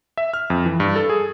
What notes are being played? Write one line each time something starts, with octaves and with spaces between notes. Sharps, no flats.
E5
F6
F2
E3
G2
A4
G#4